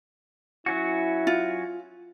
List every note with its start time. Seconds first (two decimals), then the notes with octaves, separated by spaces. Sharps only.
0.66 F#3 C#4 E4 F#4
1.27 F4